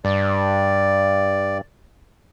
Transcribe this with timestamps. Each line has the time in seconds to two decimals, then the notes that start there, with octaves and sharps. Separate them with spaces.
0.05 G2 D5